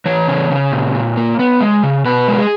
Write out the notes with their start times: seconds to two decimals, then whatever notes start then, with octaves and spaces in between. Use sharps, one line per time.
0.06 E3 C#5
0.28 C#3
0.50 C#3
0.72 A#2
0.95 A#2
1.17 A#3
1.39 B3
1.61 G#3
1.83 C#3
2.05 B2 B4
2.28 G#3 A#4
2.38 G#4